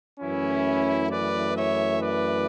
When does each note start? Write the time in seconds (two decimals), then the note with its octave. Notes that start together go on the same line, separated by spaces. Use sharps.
0.20 F#2 E3 A3 C#4 E4
1.10 B4 D5
1.55 C#5 E5
1.99 B4 D5